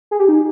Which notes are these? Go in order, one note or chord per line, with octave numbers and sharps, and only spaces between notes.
G#4
G4
D#4